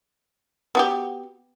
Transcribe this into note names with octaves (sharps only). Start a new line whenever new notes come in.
B3 F#4 G4